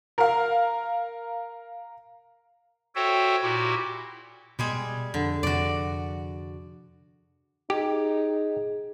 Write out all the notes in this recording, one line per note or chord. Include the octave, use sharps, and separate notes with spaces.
A#4 F5
F#4 A4 C5 C#5 E5 G5
A#2 E4 F#4 G4
B2 G3 G#3 G#4
F2 D3
F2 C3 F#4 D5
D#4 G4 G#4